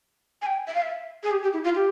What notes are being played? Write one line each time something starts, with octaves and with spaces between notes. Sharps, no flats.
G#5
G5
E5
F5
E5
G#4
G4
G4
E4
F4
G4